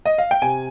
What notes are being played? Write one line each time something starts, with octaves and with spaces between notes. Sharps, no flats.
D#5
F5
G5
C3 G#5